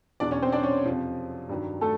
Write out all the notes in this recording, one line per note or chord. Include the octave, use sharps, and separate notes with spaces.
E2 B2 F#3 D4 D5
C#4 C#5
C4 C5
D4 D5
C#4 C#5
F2 C3 F3
G2 D#3 F#3
A3 A4